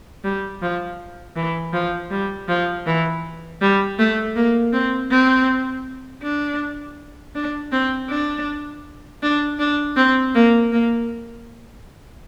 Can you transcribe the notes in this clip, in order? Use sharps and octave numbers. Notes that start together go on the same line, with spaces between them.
G3
F3
E3
F3
G3
F3
E3
G3
A3
A#3
C4
C4
D4
D4
C4
D4
D4
D4
C4
A#3
A#3